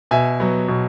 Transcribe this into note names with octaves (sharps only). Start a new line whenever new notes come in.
B2 E5 G#5
F#3 B3
B2